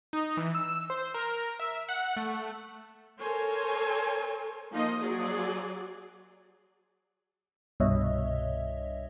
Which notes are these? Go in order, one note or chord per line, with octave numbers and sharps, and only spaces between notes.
D#4
E3
E6
C5
A#4
E5
F#5
A3
A4 A#4 C5 C#5 G#5
F3 A#3 D#4 D#5
F#3 G#4 D5
C2 G2 B2 C#5 D#5 E5